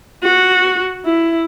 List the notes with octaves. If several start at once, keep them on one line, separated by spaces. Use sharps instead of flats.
F#4
E4